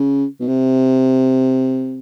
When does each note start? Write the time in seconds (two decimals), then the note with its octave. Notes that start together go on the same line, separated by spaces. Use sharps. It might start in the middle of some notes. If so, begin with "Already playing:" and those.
Already playing: C#3
0.40 B2
0.47 C3